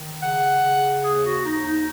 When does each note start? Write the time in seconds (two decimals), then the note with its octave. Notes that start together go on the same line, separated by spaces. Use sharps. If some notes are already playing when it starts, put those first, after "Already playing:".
Already playing: D#3
0.20 C#3 F#5
0.61 C#3
1.03 D#2 G#4
1.23 F#4
1.44 D#2 D#4
1.65 D#4